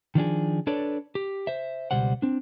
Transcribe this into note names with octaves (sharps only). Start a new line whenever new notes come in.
D#3 F3 D4 G#4
D4 A4 B4 C#5 D5
G4
C5 E5
C#2 B2 G3 C5 F#5
C4 D4